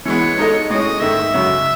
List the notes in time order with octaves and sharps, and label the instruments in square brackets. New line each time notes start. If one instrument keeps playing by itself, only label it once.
[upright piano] E3 G#3 B3 [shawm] C#5
[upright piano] G#3 D#4 A4 D#5
[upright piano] A2 G#3 C#4 [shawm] D#5
[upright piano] G#2 D#3 A3 [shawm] E5
[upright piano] F#2 C#3 G#3 C#4 F#4